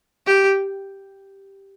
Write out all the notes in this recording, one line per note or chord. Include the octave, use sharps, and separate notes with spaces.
G4